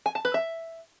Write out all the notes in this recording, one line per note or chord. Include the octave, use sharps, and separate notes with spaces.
G#5
A5
B4
E5